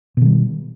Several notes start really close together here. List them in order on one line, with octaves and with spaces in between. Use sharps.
B2 D#3 G3